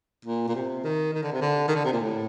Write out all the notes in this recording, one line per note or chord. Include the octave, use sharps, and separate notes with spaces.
A#2
A#2
C3
D#3
D#3
D3
C3
D3
D#3
D3
C3
A#2
A2